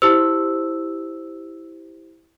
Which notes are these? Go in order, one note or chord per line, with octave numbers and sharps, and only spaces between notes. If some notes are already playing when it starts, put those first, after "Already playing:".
E4 G4 C5 E6